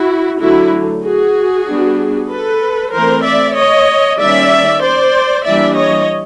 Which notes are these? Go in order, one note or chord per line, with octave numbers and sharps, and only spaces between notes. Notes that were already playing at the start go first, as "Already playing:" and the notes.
Already playing: E4 F#4
D3 F#3 A3 E4 F#4
F#4 G#4
G3 B3 D4
A4 B4
E3 A3 C4 A#4 C5
D5 E5
C#5 D#5
D#3 G3 A#3 C#4 D5 E5
C5 D5
E3 G3 A#3 D4 D5 E5
C#5 D#5